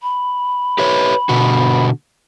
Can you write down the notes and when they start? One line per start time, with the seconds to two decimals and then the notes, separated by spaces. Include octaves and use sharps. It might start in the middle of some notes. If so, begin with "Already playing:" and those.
0.02 B5
0.78 G4 B4 C#5
1.29 B2 D3 F#4